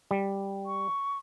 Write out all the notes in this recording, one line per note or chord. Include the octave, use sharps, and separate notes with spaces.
G3
C#6